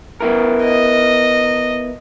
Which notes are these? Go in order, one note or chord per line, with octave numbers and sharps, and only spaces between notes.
B3 E4 A#4
D#5